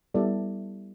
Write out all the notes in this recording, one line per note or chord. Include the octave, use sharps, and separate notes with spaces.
G3 B3 E4 A4 D5